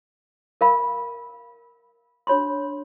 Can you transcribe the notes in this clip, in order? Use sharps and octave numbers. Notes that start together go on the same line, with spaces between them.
A#4 F5 B5
D4 F#4 C#5 B5 C6